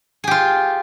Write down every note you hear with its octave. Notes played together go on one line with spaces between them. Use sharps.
F4 G4 G#4